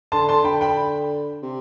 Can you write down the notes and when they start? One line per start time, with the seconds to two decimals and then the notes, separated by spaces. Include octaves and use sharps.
0.12 D3 A5 C6
0.29 A5 C6
0.45 D3 G5 B5
0.61 G5 B5
1.43 C3